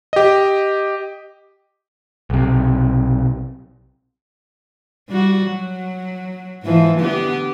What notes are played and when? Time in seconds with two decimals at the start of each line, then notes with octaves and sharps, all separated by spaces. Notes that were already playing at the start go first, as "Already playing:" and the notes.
0.13 G4 D#5
2.30 B1 C3
5.09 G3 F#4
5.48 F#3
6.63 G#2 E3 F3
6.99 D3 B3 G4